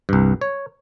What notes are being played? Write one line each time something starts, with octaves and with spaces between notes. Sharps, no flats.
C2 G2
C#5